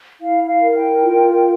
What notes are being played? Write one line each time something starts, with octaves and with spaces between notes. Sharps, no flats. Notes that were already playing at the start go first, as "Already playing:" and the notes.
E4 F5
F5
A#4
G5
F4